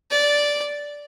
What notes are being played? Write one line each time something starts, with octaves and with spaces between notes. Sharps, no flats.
D5